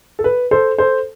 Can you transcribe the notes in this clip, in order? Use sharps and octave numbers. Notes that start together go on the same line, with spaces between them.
A4
B4
A4 C5
A4 C5